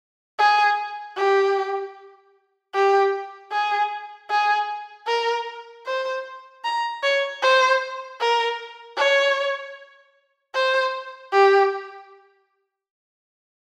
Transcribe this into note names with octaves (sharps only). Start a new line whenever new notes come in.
G#4
G4
G4
G#4
G#4
A#4
C5
A#5
C#5
C5
A#4
C#5
C5
G4